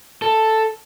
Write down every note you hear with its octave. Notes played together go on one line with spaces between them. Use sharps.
A4